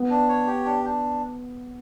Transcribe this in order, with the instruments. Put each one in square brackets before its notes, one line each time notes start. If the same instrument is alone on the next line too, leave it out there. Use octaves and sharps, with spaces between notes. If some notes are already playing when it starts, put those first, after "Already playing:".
Already playing: [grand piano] B3
[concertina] D4
C#5
G4
D4
D4